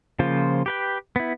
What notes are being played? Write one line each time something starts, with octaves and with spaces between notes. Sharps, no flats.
C#3 F3 A#3 F4 C5
G4 B4 G5
B3 E4